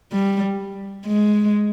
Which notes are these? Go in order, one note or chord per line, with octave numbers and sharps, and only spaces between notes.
G3
G#3